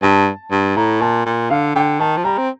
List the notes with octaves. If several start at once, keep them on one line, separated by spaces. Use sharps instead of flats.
G2 A5
G2
A2 A#5
A#2 A5
A#2
D3 F5
D3 G5
D#3 A5
F3
G3 A#5
C4